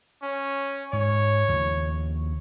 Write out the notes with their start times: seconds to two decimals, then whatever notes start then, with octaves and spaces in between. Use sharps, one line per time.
0.23 C#4
0.93 G#2 C#5
1.48 D#2 C#3 F3